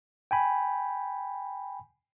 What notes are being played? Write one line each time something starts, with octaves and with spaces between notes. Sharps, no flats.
G5 G#5 B5